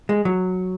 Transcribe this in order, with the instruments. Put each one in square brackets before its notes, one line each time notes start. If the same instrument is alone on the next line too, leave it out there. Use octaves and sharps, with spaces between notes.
[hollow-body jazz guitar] G#3
F#3